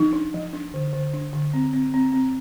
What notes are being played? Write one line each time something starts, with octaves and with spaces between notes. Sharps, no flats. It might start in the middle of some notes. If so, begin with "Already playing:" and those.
Already playing: F3 D#4
D4
F3
D4
D3
D3
D4
D3
C4
C4
C4
C4